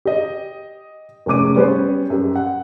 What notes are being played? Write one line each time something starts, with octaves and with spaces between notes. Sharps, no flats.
G4 D#5
F1 G#3 C#4 D6 D#7
G3 B3 C#4 G4 C5
F#2 G4
F#5